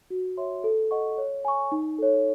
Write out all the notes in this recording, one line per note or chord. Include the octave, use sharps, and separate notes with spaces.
F#4
C#5 E5 C6
A4
D#5 F#5 C#6
C#5
G#5 C#6
D#4
A4 C#5